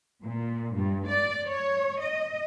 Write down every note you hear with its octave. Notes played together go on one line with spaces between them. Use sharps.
A#2
G2
D5
C#5
D#5